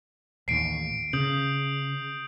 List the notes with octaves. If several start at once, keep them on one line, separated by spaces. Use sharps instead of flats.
A1 D#2 C7 D7
C#3 D#6 G6 F#7